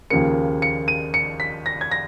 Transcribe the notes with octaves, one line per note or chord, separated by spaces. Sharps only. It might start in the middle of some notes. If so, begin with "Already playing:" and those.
D#2 C#3 F3 A#3 C#7
C#7
D#7
C#7
B6
A#6
G#6
A#6